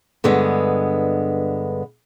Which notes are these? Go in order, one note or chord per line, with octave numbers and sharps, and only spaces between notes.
G2 D3 G#3 B3